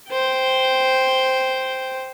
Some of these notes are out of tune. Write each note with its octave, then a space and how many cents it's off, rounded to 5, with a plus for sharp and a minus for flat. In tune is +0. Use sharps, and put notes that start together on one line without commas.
C5 +0 G5 +0